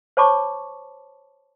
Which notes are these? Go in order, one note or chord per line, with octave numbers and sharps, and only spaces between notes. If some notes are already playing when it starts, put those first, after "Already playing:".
C5 C#5 A5 B5 C#6 D6